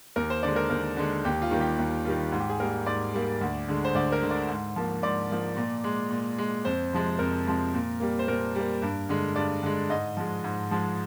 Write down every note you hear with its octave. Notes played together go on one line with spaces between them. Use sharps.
D#2 A#4
C5
D3 G#3 D5
A#4
D#2 A#4
D3 G#3
D#2 G4
F4
D#3 G3 A#3
G4
D#2
D#3 G3 A#3 F4
G#2
G4
G#4
G3 A#3 A#4
G#2 D5
G3 A#3
D2
D3 G#3
C5
D2 D5
A#4
D3 G#3
D5
G#2
F3 A#3
G#2 D5
F3 A#3
A#2
G#3
A#2
G#3
F2 C5
C3 F3 G#3
F2 A#4
C3 F3 G#3
A#2
G3 A#3
C5
A#2 A#4
G3 A#3
G2
D3 G#3
G2 D5
D3 G#3
G#2 D#5
F3 G#3
G#2
F3 G#3